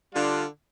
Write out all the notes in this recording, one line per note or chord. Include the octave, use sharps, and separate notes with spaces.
D3 G3 D4 F4